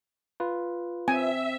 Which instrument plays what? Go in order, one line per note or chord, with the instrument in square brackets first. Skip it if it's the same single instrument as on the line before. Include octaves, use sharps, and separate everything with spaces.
[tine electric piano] F4 B4
[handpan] C4 [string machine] E5 [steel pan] G#5